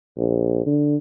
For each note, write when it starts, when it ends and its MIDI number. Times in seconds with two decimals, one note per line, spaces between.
0.17 0.64 34
0.66 0.96 50